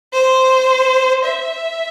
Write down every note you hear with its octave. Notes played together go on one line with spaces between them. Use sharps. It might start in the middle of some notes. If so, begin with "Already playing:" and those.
C5
E5